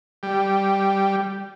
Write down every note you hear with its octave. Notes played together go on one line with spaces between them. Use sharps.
G3